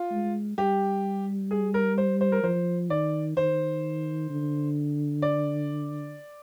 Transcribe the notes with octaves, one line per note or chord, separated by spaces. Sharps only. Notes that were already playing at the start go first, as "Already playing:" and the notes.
Already playing: F4
G#3
G3 G4
G#4
A#4
C5
C5
A#4
F3 C5
D#3 D5
D#3 C5
D3
D5